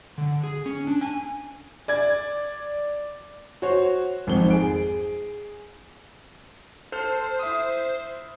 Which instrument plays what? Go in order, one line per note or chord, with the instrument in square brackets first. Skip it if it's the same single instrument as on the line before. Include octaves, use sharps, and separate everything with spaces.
[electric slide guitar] D3
G#4
C#4
D4
G#5
[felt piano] D5 G#6
[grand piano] F#4 C5 C#5
G#1 F2 F3 G7
G#4 D7
[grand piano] A4 F6 [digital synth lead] C5
[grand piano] E4 D#6